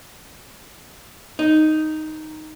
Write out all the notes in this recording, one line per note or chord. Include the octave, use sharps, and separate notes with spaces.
D#4